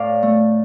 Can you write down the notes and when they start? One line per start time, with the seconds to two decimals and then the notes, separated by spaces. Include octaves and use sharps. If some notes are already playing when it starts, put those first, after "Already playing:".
Already playing: A2 D5 F5
0.23 A3